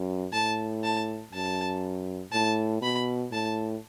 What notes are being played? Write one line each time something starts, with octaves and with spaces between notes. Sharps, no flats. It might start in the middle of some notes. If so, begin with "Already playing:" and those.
Already playing: F#2
A2 A5
A5
F#2 A5
A2 A5
B2 B5
A2 A5